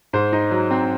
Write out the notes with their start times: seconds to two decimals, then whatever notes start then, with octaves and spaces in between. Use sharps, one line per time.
0.13 G#2 C5
0.33 D#4
0.51 F#3
0.71 C4